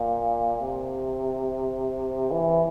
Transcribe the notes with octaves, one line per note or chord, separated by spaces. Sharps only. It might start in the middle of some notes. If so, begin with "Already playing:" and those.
Already playing: A#2
C3
E3